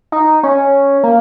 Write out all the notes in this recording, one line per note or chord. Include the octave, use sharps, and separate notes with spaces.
D#4
C#4
A#3